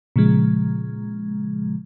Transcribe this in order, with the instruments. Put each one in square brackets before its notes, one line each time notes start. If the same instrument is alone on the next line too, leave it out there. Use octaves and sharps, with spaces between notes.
[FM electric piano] A#2 C#3 F3 G#3